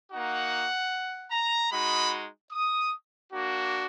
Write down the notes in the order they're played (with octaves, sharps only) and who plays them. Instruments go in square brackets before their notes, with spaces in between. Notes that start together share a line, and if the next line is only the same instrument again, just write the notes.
[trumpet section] A#3 D#4 F#4 F#5
A#5
G#3 D#4 F#4 B5
D#6
A#3 D4 F#4